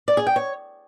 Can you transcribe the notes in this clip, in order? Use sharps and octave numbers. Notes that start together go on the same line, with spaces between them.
D5
G#4
G5
C#5